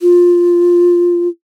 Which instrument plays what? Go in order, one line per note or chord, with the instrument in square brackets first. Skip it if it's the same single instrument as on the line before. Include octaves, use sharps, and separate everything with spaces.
[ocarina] F4